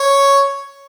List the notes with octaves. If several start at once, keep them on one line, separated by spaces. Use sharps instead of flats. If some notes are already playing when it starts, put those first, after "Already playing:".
Already playing: C#5